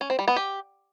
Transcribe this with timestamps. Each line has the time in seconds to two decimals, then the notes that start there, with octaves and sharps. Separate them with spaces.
0.01 C#4
0.10 C4
0.19 G3
0.28 B3
0.36 G4